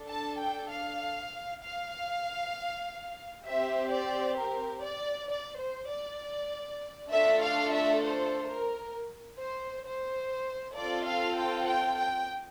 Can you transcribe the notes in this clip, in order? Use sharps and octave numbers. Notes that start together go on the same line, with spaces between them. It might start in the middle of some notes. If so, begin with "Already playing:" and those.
Already playing: D4 A4
A5
G5
F5
F5
C4 G4 E5
D5
A#4
D5
D5
C5
D5
A3 D4 F4 A4 E5
F5
E5
C5
A#4
C5
C5
C4 F4 A4 D5
F5
G5
G5
G5